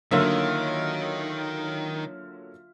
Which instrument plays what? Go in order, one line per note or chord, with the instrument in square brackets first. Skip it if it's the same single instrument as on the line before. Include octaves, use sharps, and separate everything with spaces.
[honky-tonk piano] D3 F#3 A#3 [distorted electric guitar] D#3 [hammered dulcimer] F4 E5